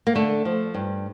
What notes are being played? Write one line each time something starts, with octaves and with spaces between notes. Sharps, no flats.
A#3
D3 A3
F3
G2